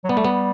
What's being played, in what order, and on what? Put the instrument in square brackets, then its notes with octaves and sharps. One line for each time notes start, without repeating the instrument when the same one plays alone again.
[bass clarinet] F#3
[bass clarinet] G3 [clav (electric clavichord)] B3
[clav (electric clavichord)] A3
B3